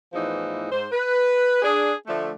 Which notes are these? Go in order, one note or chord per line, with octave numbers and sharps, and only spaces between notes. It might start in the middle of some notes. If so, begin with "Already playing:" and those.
E2 A2 E3 F3 D#4
G#2 C5
B4
D4 G#4
D3 F3 A3